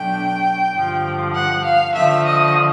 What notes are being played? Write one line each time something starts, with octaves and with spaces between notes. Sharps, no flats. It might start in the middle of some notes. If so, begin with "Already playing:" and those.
Already playing: B2 F#3 A3 D4 G5
G2 D3 F3
F#5
F5
D3 F3 A3 E5
D#5